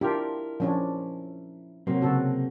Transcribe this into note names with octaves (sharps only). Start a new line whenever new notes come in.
D4 E4 F4 G4 A#4
F3 C#4 D4
C3 F#3 A#3 C4
C#3 F#4 A4